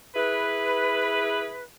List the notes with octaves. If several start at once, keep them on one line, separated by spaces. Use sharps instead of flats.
E4 G#4 B4